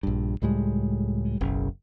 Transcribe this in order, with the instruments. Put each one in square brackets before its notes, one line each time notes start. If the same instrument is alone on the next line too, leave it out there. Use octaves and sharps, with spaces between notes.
[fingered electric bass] A#1 G2
C#2 A2 G3 G#3
F#1 B1 C#3